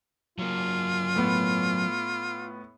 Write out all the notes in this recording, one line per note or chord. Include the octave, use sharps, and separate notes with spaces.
F#3 A#3 F4
A2 B3